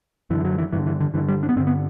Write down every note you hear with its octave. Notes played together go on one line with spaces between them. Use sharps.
F#2 D3 E3
F#3
E3
G2 D3 E3
E3
D3
G2 D3 E3
G3
D4
B3
G2 D3 C4
B3